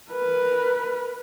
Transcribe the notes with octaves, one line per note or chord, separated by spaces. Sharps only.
A#4 B4